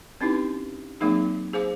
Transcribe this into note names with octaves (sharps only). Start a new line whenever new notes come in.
C4 C#4 D#4 E4 G4 B4
F#3 A#3 C4 D#4 G#4
G#4 C5 F5 D6